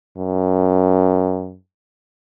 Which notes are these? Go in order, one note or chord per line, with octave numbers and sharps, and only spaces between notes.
F#2